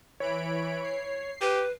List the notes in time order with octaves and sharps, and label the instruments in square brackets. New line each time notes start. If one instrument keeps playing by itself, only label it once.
[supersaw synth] E3 B5 D7 [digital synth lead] C#5
[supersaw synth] C7
[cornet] G4 [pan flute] B4